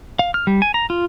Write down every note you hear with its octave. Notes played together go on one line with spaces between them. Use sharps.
F5
F6
G3
G#5
A#5
F4